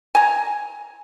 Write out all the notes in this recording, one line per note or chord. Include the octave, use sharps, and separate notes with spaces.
G#5 A#5